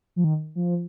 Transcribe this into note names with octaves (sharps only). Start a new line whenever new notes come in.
F3
D#3
F3